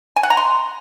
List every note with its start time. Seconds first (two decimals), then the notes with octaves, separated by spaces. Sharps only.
0.16 G#5
0.23 F#5
0.30 A#5
0.37 C6